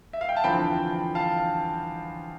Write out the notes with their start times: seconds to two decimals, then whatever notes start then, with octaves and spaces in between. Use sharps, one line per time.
0.13 E5
0.21 F5
0.29 G5
0.37 A5
0.44 E2 D3 F3 C4 G5 B5
1.15 F5 A5